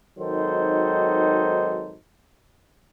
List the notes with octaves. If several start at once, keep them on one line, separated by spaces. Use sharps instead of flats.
G#1 D#3 F#3 D#4 A4 C5